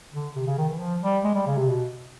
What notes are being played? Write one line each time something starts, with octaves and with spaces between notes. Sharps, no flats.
D3
C3
C#3
D#3
E3
F3
G3
G#3
G3
C#3
C3
B2